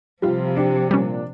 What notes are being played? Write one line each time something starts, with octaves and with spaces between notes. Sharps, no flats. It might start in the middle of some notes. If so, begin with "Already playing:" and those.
C3 F3 G3 F4
D4 G4
A#2 G3 C#4